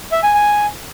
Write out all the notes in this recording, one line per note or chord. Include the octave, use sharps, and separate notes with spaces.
E5
G#5
G#5